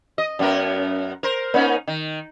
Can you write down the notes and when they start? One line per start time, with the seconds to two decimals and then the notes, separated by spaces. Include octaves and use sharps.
0.18 D#5
0.39 F#2 B3 A#4
1.23 A#4 C5
1.54 A#3 C#4 D#4
1.87 D#3